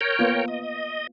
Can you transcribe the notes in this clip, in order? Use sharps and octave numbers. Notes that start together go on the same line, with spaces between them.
A#4 C#5 G5
A#3 B3 F4
D#5